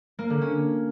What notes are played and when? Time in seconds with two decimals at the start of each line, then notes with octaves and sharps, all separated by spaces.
0.19 A#3
0.30 D3
0.41 C#4